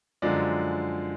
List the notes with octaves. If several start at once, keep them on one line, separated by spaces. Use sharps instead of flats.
F#2 D3 F3 G#3 D5